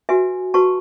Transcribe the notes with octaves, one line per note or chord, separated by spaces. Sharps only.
F#4 B4 E5 G#5
F#4 B4 A5 C#6